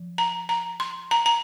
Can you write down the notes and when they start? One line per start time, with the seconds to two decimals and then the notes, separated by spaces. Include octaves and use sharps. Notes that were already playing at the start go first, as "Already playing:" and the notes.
Already playing: F3
0.18 A#5
0.49 A#5
0.80 C6
1.11 A#5
1.26 A#5